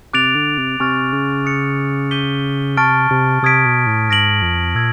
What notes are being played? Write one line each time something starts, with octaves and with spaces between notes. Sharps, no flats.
C3 D6 F#6 A6 D7 F7
D3
C3
C3 G#5 C#6 F6 A6
C#3
D#6 F#6 A6 C#7
D6 G6 B6 D#7 G7
C3 A5 C#6 F6 A6 D7
C3
C3 D#6 G#6 B6 D7
B2
A2
G#2 F6 A#6 D7 F#7
F2
A#2 E6 G#6